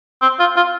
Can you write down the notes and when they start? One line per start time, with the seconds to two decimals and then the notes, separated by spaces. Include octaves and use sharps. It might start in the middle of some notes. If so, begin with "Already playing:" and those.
0.22 C4
0.40 F4
0.56 F4